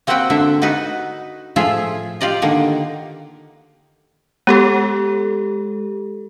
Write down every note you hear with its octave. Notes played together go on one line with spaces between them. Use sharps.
A#3 C4 F#4 B4 F#5 G5
D3 A#3 E5
B3 D#4 F#4 B4
A2 F3 F4 G#4 E5
F4 G4 D5 D#5
D3 D#3 A#3
G#3 B3 G4 A4